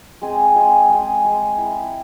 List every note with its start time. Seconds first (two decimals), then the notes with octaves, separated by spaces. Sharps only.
0.22 G#3 C4 G#4
0.55 G#3 C4 G#4
0.89 G#3 C4 G#4
1.24 G#3 C4 G#4
1.58 E4